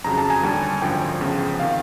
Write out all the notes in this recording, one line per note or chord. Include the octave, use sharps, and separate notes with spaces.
F2 C#3 F#3 A#5
A5
G#5
D#2 D3 G3
G#1 F#2 D3 F3 G5
E2 C#3 F3
C3 D#3 F5